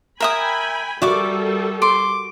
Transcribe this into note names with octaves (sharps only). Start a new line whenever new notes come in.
A#4 E5 G5 G#5 B5 D#6
G3 F#4 A4 A#4 D5 E5 D6
C6 D6